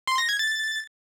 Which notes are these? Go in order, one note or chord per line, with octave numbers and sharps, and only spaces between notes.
C6
A#6
G#6
A6